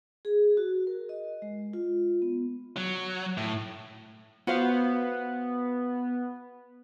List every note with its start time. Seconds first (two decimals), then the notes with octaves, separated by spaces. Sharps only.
0.25 G#4
0.57 F#4
0.87 A#4
1.09 D#5
1.42 G#3
1.73 F4
2.22 B3
2.77 F#3
3.38 A2
4.47 B3 F#4 C5 F5